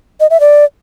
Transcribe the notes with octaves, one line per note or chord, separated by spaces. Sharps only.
D#5
E5
D5